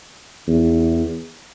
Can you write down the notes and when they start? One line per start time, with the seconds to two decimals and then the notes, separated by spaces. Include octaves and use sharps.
0.48 E2